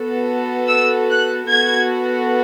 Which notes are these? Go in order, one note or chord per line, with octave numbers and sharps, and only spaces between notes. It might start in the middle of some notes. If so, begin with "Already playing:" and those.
Already playing: B3 F#4 A4
E6
F#6
B3 F#4 A4 G#6